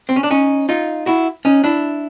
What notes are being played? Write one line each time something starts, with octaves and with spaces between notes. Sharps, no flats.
C4
C#4
D4
C#4 D#4
D#4 F4
E4 F#4
C#4 D#4
D4 E4